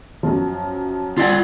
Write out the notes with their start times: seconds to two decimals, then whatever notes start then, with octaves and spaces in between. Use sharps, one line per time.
0.23 F#2 F3
1.18 F4 D5 F#5